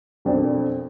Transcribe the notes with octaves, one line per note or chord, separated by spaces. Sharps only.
B1 F2 D4 A#4